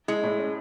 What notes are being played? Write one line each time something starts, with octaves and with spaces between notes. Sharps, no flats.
G#3 E4
A2
C#4